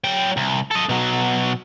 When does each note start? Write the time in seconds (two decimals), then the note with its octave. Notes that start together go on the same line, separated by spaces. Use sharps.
0.04 F#3 G5
0.37 C2
0.71 A4 D#5
0.89 B2 F#3